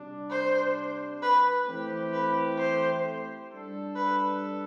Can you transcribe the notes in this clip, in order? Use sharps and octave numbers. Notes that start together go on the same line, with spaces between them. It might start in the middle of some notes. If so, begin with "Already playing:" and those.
Already playing: C3 G3 D4
C5
B4
E3 A3 C4 G4
B4
C5
G3 D4 A4
B4